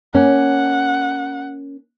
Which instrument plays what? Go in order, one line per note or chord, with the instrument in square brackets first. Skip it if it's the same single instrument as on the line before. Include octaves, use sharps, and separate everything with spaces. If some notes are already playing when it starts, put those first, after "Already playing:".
[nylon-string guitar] A#3 C#4 [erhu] F#5